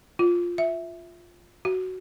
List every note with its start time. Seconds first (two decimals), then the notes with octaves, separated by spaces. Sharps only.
0.19 F4
0.58 E5
1.65 F#4